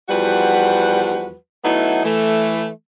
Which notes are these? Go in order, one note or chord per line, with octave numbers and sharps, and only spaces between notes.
E2 F3 G3 F#4 B4 F#5
F#3 A3 B3 D#4 E4
E3 A3